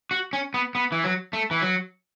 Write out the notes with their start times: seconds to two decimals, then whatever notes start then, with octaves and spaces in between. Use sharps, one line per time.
0.11 F#4
0.33 C#4
0.54 B3
0.75 B3
0.92 E3
1.04 F#3
1.33 A3
1.51 E3
1.61 F#3